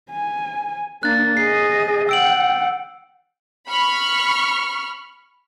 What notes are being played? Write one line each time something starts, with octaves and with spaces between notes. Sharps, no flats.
G#5
A#3 D4 F#6 A6
G#4 D#5 C7
F#5 G5 E6 D7 F#7
B5 C#6 F6